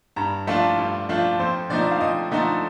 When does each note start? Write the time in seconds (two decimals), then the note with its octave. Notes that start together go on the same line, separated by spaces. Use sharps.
0.16 G2 A#5
0.47 F3 A3 D4 F4 A5
0.77 G2
1.09 F3 A3 D4 F4
1.39 F2 C5
1.70 D3 F3 A3 D#4 D5
1.91 F5
2.01 F2 D#5
2.31 D3 F3 A3 D#4